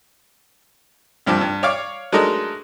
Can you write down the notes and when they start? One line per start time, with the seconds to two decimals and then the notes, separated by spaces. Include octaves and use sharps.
1.26 C2 G2 F3 D6
1.41 G2
1.63 C#5 D5 F5 D6
2.12 F#3 G#3 A3 D4 D#4 A#4